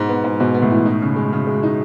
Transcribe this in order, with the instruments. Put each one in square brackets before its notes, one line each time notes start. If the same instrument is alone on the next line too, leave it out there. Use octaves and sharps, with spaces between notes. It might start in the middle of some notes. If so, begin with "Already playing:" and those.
Already playing: [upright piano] G#2 [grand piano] B2
[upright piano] B3
G#2
[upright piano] G#2 [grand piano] B2
[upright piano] B3
[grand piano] A2
[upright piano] E3
D#4
C#3
G#3
C#3
G#3
D#4